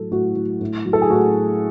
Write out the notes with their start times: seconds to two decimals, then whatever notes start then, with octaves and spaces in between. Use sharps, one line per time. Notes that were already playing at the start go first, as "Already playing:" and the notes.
Already playing: A2 F#3 A4
0.11 A2 F#4
0.36 F#3
0.61 A2
0.86 F#3
0.93 A4
1.02 G#4
1.10 A2 F#4